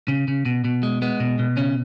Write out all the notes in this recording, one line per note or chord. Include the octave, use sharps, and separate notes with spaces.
C#3
C#3
B2
B2
G#3
G#3 B3
B2
B2
C#3 C#4